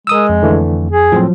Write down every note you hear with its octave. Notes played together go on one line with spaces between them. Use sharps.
G#3 A#4 D#6 E6
F2
D3 E3 A3
G#4
A2 F3 F#3 C4